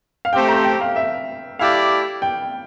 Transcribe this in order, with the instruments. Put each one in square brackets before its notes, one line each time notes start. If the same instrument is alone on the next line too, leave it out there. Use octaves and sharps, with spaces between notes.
[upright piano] F5
[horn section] A3 C4 G4 [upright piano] G5
[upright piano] A#5
G5
F5
E5
[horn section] A3 E4 G4 D5 [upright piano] F5
[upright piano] G5